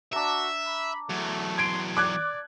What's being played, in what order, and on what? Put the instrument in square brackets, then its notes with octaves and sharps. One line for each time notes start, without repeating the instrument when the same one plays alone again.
[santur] D4 A#5 [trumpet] F#4 [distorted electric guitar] E5
[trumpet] B5
[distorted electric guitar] E2 F#3 [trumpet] A3
[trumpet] C6 [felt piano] G#6 D7
[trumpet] D5 [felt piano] D6 F#6 G#6